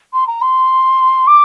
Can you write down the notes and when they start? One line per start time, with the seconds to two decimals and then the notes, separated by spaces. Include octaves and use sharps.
0.13 C6
0.27 A#5
0.41 C6
1.27 D6